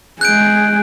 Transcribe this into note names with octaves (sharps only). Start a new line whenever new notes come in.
G#3 G#4 F#6 G6 D7